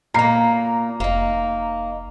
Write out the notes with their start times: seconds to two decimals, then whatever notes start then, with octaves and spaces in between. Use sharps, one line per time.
0.14 A#2 A#3 A#5 C7
1.00 F1 A#3 D#4